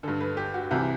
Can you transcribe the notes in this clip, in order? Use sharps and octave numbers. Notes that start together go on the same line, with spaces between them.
G2 D3 A4
B4
G4
F#4
C2 C3 E3 E4